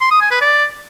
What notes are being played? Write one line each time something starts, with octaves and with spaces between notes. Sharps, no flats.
C6
D#6
G#5
B4
D5